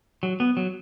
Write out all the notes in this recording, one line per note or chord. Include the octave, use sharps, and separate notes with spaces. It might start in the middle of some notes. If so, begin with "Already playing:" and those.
F#3
B3
F#3